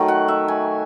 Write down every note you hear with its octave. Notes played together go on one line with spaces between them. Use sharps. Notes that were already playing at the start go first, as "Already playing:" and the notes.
Already playing: D#3 F#3 A3
F#5
E5
G#5